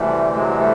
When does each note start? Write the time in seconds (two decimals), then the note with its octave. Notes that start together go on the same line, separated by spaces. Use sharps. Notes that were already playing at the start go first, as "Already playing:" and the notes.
Already playing: D2 C3 E3 G3 A3
0.34 F#3 G#3
0.49 G#3
0.59 G3 A3